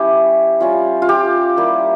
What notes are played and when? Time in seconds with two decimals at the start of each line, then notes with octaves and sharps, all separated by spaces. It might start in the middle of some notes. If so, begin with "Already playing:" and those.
Already playing: G3 C#4 E4 G4
0.60 G3 C#4 F4
1.02 F4
1.09 G4
1.57 G3 A#3 E4